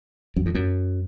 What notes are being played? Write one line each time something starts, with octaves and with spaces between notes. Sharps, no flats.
F#2
F2
F#2